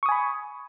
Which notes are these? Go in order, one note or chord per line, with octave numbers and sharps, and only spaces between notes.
G#5 B5 C#6 D#6